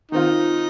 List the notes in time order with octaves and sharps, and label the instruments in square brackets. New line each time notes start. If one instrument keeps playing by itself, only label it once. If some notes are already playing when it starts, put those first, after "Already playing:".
[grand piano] D#3 C4 F4 [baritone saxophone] D#4